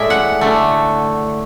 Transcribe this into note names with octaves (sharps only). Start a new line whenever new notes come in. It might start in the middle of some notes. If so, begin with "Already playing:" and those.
Already playing: A2 G#3 D5 E5
F#5
D3 A3